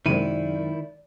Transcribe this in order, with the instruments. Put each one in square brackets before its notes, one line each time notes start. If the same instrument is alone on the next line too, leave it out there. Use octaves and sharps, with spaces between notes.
[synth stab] F#2 C3 G#3 [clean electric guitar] D#3 E4 [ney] D5 [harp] D#7